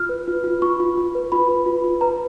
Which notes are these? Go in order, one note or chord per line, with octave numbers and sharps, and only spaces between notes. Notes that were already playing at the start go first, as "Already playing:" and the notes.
Already playing: F4 F6
B4
F4
F4
F4 C#6
F4
F4
B4
F4 B5
B4
F4
F4
B4 A#5